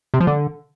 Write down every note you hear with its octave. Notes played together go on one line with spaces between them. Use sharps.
C3
F3
D3